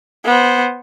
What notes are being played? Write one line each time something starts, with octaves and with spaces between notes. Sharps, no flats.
B3 C5